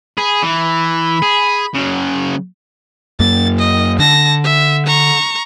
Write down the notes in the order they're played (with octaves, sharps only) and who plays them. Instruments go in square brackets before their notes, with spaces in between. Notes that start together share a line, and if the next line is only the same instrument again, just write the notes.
[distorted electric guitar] G#4 [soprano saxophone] B5
[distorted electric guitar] E3
G#4
C#3 F#3
[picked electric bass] F#2 A#3 [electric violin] A6
[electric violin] D#5
[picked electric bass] D3 [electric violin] A5 A#6
[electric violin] E5
A#5 C#6